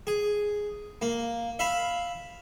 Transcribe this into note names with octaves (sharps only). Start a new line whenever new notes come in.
G#4
A#3
E5 F5 B5